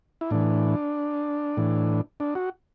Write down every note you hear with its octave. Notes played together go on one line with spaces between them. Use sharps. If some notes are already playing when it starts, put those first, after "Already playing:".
E4
A2 E3 D4
A2 E3
D4
F#4